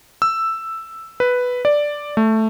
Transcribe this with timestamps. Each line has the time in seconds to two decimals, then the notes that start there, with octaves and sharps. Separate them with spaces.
0.22 E6
1.20 B4
1.65 D5
2.17 A3